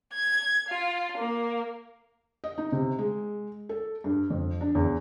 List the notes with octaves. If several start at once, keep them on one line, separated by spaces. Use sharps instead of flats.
G#6
F4
A#3
D#5
D#4
C3
G#3
A4
G2
F2
D4
E2